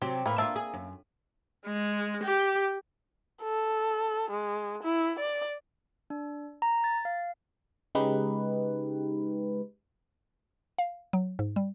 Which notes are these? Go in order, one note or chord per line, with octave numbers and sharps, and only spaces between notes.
C3 F#3 C4 G4
A2 E3 A#3 B5
A#3 C4 D4 F4 E5 A5
G#4
F#2
G#3
G4
A4
G#3
E4
D5
D4
A#5
A6
F5
C#3 G#3 D#4 G4 B4
F5
F#3
G#2
G3